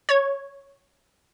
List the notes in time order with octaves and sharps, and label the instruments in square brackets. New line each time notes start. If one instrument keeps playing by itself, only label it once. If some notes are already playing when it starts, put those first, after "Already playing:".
[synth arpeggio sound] C#5 G#6